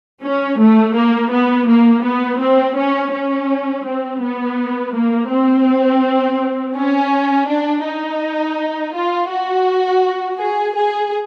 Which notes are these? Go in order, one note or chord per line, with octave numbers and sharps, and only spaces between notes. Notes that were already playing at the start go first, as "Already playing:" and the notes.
C#4
A3
A#3
B3
A#3
B3
C4
C#4
C#4
C4
B3
A#3
C4
C#4
D4
D#4
F4
F#4
G#4
G#4